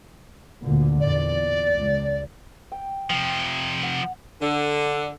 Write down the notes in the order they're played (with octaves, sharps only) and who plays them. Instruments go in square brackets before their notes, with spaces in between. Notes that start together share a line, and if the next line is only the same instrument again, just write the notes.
[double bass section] D2 A#2 D3
[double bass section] E2 A#2 [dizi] D5
[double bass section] C#2
[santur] G5
[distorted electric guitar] C3 F3 [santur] G5
[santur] F#5
[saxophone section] D3